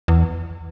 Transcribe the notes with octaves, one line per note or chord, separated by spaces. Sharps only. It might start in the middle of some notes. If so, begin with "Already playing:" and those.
E2